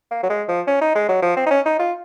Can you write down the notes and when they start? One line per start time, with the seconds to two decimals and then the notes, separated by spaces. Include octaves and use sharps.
0.11 A#3
0.23 F#3
0.30 G#3
0.48 F3
0.67 C#4
0.81 D#4
0.95 G#3
1.08 F#3
1.22 F3
1.37 C4
1.47 D#4
1.51 C#4
1.65 D#4
1.79 F4